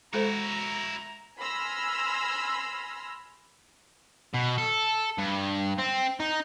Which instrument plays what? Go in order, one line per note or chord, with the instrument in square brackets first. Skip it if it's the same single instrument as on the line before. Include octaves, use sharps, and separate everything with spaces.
[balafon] G#3 A4 C5 [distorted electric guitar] E4 F#4 [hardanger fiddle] A#5
[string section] G#5 B5 C6 E6 F6 A#6
[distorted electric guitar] B2
A4
G2
C4
D#4